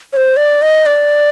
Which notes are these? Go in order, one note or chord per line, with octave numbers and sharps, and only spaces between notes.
C#5
C5
D5
D#5
D5